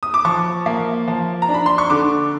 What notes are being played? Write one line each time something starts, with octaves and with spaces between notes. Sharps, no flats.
D#6
D6
F3 C#6
A#3
F3
A#5
D4
B5
C6
C#6
D3 D6